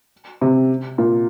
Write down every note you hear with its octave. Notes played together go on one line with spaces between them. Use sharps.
C3
A#2